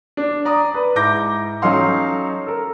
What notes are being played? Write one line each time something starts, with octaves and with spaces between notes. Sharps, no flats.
D4
D5 A#5 D#6
B4
G#2 E4 D6 G6 A#6
F#3 C#4 D#4 A4 F5 C6
A4 A#4